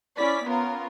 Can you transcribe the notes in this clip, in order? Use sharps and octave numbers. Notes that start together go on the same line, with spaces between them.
C#4 E4 D5 B6
B3 C#4 F4 A#4